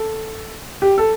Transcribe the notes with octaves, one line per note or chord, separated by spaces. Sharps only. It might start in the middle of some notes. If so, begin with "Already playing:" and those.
Already playing: A4
G4
A4